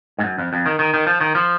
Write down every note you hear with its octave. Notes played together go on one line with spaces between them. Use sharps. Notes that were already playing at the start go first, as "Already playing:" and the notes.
G#2
F#2
F2
F2
D#3
D#3
D#3
F3
D#3
F3